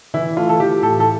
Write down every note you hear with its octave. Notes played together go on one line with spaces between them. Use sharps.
E3 E4
A3 F4
A4
E3 G4
A2 A4
A4